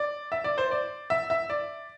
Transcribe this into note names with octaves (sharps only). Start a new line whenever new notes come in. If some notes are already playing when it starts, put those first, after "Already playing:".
Already playing: D5
E5
D5
C5
D5
E5
E5
D5